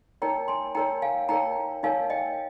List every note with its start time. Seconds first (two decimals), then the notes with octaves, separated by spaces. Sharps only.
0.22 D#4 A#4 C#5 G5 A#5
0.48 G#5 C6
0.75 D#4 A#4 C#5 G5 A#5
1.02 F5 G#5
1.29 D#4 A#4 C#5 G5 A#5
1.83 D#4 A#4 C#5 F5 G#5
2.10 D#5 G5